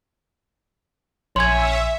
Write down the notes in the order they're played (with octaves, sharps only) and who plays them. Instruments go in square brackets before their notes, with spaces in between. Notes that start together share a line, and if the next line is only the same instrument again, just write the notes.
[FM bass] A#1 [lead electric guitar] C#5 G#5 [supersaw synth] E5 [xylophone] C6 G#6